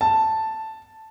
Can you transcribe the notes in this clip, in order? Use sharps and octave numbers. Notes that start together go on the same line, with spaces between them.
A5